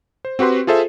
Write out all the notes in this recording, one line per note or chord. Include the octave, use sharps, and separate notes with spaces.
C5
C4 F#4 G4 B4 C6
F4 G#4 A4 C5 E5